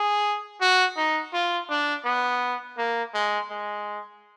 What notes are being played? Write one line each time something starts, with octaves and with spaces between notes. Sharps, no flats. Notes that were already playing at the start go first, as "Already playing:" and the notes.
Already playing: G#4
F#4
D#4
F4
D4
B3
A#3
G#3
G#3